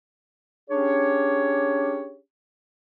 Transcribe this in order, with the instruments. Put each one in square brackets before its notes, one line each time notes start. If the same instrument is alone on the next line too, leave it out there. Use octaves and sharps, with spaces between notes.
[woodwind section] C#4 D4 G4 G#4 C#5